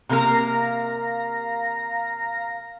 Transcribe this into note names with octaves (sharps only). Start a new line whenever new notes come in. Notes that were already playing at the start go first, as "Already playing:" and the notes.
C3 A#3 A#4 F5 A#5 A#6